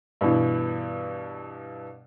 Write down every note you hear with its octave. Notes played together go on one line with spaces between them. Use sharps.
G2 B2 E3